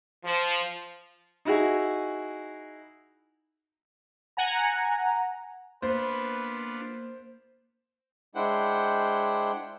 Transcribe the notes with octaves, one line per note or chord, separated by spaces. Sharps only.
F3
D#4 E4 F#4 G#4
F#5 G#5 A#5
A#3 B3 D4 F4 B4 C5
G#3 D4 E4 C5 F#5 G5